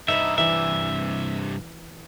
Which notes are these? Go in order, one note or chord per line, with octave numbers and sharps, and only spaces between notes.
G2 C3 D#4 E5 A#5 B5
E3 D5 E5